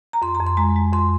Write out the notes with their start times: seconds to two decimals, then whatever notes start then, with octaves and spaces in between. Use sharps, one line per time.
0.13 A#5
0.22 F2 C6
0.35 F2 A#5
0.47 C6
0.57 G#3 A#5
0.76 G#3
0.93 F2 C6